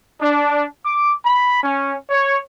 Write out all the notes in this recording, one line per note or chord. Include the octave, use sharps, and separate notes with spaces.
D4
D6
B5
C#4
C#5